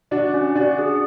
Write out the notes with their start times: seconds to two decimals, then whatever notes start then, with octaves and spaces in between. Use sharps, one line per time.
0.11 D4 F#4 D5
0.34 C#4
0.55 D4 F#4 D5
0.78 G#4